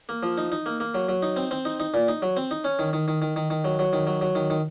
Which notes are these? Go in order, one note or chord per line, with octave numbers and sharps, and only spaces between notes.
A#3
F3
D#4
D#4
A#3
A#3
F#3
F#3
D#4
C4
C4
D#4
D#4
A#2
D#4
F#3
C4
D#4
C#4
D#3
D#3
D#3
D#3
D#3
D#3
F#3
F#3
D#3
F#3
F#3
D#3
D#3